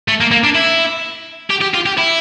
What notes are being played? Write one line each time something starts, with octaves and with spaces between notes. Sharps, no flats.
A3
A#3
A#3
D4
E4
G4
G4
F4
G4
E4